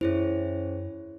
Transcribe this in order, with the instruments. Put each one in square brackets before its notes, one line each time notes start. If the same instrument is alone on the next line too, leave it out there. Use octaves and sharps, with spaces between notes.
[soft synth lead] F#2 [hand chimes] C#4 G#4 C5 [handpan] E4 C#5